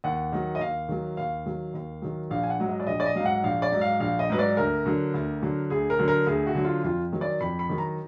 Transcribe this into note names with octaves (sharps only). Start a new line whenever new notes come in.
D#2 F#5
D#3 F#3
D#5
D#2 F5
D#3 F#3
D#2 F5
D#3 F#3
D#2
D#3 F#3
A#1 F5
G#5
F#5
G#2 F#3
D#5
D5
A#1 D#5
D5
D#5
F#3 F5
G#2
F#5
A#1 F5
D5
G#2 F#3
F5
A#1 F5
D#5
G#2 F#3 B4
D5
D2 A#4
D3 F#3
D2
D3 F#3
D2 G#4
A#4
D3 F#3
A#4
D2 G#4
F#4
D3 F#3
F4
F2 F4
D#3 F#3
D5
F2 B5
B5
D#3 F#3
A#5